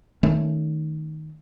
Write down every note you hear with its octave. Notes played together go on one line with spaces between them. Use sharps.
D#3 A3 C#4